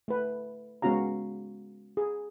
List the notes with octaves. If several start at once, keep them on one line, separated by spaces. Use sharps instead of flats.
A3 B4
G#3 B3 C#4 F#4 F5 A#5
G#4